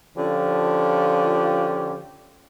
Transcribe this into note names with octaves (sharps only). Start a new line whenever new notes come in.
D3 F3 C#4 F4 G4